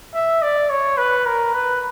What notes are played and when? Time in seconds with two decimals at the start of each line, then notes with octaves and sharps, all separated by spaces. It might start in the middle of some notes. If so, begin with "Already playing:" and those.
0.14 E5
0.42 D5
0.70 C#5
0.98 B4
1.26 A#4
1.54 B4